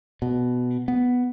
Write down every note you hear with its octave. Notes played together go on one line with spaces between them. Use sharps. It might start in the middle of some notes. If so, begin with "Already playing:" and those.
B2
B3